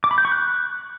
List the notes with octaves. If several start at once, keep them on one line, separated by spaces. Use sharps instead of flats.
D6
B5
G6
C#6
F#6